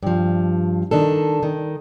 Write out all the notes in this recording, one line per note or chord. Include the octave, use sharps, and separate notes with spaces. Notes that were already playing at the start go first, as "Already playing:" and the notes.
G2 F3
D#3 D4 A4
D#3